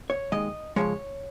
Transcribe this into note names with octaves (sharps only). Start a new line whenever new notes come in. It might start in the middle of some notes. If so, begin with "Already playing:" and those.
C#5
D#2 D#3 G#3 D#5
C#2 C3 F3 G#3 C#5